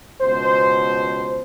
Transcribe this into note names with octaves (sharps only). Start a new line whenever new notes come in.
C#2 B2 C5